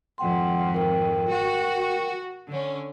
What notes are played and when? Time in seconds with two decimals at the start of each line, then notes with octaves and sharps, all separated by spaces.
0.18 G#1 F2 F#5 G5 C6
0.74 A#4 G5
1.29 F#4
2.49 D3 C#4